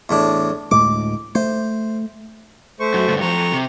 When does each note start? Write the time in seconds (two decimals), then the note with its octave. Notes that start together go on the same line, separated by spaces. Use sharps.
0.09 E2 A2 D4
0.71 D2 A2 G#3 D6
1.35 A3 C5
2.80 A3 C5 C#6
2.94 F#2
3.08 D2 G2
3.21 F2 F3 A#5 C#6
3.52 C3